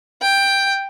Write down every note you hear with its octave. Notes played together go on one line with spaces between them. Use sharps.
G5